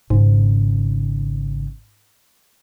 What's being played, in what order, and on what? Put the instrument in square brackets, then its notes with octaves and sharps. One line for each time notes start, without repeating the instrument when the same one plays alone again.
[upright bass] G#1 C#3 [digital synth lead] G#2